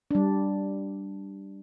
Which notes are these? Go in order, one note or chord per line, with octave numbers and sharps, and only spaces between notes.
G3 D4